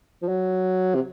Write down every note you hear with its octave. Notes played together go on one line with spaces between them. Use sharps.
F3
F#3
C3